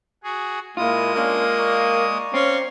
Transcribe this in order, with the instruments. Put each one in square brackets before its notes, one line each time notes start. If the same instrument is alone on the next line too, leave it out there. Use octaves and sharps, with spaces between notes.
[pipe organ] F#4 G#4
[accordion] A#2 E4 [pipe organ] G#3 D#6 [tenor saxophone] A#3 [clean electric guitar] F4
[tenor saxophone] A#3 [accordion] C#4 D4 A#4
[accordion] D5 A#5 C#6
[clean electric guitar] C4 [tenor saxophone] C#4 [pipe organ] F5 C6